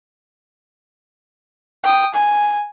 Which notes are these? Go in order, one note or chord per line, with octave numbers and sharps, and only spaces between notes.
G5 D#6
G#5